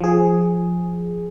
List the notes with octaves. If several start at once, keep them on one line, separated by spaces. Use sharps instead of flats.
F3 G#4